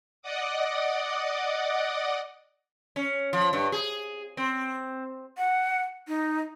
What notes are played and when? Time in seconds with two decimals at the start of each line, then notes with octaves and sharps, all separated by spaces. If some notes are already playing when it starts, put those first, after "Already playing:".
0.22 D5 D#5 F#5 D6 D#6
2.96 C#4
3.33 F3
3.53 G2
3.72 G#4
4.37 C4
5.37 F#5
6.08 D#4